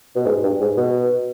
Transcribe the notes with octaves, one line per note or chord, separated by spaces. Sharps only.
B2
G#2
G2
G#2
B2